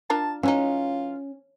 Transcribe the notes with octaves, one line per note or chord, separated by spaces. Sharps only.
D4 F4 A#4 A5
E3 G#3 C#4 D#4 F4